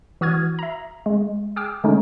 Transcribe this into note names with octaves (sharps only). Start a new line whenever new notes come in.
E3 F#4 D#6 F6 G#6
E5 A#5
G#3
G#4 G5 D6 E6 F6
D3 G#3 A3 C#4 D#4